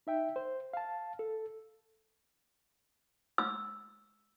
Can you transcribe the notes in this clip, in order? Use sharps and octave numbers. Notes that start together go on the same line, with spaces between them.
D#4 E5 G5
C5
F5 A5
A4
E6